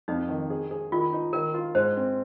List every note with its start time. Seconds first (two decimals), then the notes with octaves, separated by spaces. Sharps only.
0.08 F2 D#4
0.29 D#3
0.50 G#4
0.71 G#4
0.92 D#3 F4
1.13 D#4
1.33 D#3 A#4
1.54 F4
1.75 G#2 C5
1.97 C4